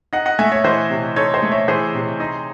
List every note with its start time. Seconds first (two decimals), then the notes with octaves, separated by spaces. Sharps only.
0.13 D#4 D#5 F#5
0.26 D#5 F#5
0.39 A3 E5 G#5
0.52 C#5 E5
0.64 E3 C5 D#5
0.90 C3
1.16 D#4 A4 C#5
1.34 C5 D#5
1.43 A3
1.52 C#5 E5
1.68 E3 G#4 C5
1.95 C3
2.20 D#4